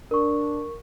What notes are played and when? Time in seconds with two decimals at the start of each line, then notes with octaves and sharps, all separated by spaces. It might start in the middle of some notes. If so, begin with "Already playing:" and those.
0.11 D4 A#4 C#6